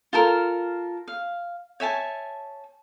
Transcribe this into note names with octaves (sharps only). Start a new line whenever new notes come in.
F4 A4 A#4
F5
C#5 E5 G#5 A5